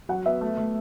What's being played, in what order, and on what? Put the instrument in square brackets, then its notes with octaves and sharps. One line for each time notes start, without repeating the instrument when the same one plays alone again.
[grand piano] F#3 [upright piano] F#5
[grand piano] B3 [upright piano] E5
[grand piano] A3
A3